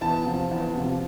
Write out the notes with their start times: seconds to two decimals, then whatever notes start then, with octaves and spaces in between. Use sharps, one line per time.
0.01 E2 A5
0.26 C3 F3
0.51 E2
0.76 C3 F3